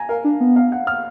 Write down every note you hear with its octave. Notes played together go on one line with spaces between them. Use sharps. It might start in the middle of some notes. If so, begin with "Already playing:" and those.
Already playing: G#5 A#5
A#4 F5
D4
B3
F5
F#5
F6